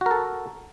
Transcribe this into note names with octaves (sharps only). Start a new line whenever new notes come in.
F#4 A4 A#4